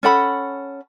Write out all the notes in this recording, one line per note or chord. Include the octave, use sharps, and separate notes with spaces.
C#4 A4 F#5 B5